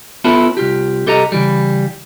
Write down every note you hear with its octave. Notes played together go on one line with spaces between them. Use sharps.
B3 E4 F4 A4 B4 C#5
C2 F4 G4
C2 G4 A4 D#5 A#5
C#3 E3 G3